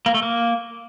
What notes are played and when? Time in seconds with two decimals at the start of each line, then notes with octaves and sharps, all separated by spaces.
0.06 A#3
0.14 A3
0.23 A#3